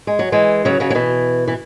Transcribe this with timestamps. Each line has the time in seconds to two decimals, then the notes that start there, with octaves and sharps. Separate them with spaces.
0.07 G#3
0.19 F#3
0.32 E3 G#3
0.65 C#3 F#3
0.80 C#3 F#3
0.90 F#3
0.95 B2 E3
1.48 E3